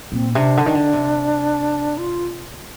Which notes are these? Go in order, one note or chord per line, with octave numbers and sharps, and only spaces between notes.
A#2 C4
C3 D4
D3
D#3
D3
C3
F4